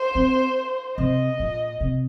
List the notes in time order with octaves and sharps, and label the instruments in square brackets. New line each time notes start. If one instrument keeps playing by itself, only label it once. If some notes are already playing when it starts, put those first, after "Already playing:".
Already playing: [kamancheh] C5
[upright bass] C4
[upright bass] C3 [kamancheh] D#5
[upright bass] A#2
C3